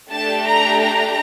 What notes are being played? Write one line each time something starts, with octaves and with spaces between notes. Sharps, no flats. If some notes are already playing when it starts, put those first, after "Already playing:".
A3 D4 G4 A5
A#5
A#5